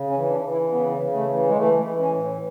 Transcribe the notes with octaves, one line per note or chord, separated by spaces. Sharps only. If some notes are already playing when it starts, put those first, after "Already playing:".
Already playing: C#3
C#4
E3
D4
E3
E4
C#3 B3
C#3
A3
E3
G#3
E3 A3
E3
C#4
A2